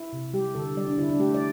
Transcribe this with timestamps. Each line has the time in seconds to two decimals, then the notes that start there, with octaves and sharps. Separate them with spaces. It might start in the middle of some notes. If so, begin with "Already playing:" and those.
Already playing: E4
0.13 C3
0.33 G3 G4
0.55 D3 A4
0.77 G3 D5
0.87 D4
0.98 D3 E4
1.09 D4
1.19 A3 G4
1.34 D5